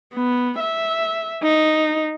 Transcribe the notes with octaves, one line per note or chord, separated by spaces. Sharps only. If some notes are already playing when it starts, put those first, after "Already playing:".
B3
E5
D#4